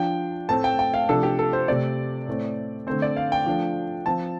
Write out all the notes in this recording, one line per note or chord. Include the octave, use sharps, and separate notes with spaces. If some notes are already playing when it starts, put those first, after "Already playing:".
Already playing: F3 D4 G5
A2 A3 C4 A5
G5
G5
F5
C3 F3 A3 D4 A4
G4
A4
C5
C3 A3 C4 D5
A2 A3 C4
D3 A3 C4 C5
D5
F5
G5
F3 A3 D4
F3 C4 A5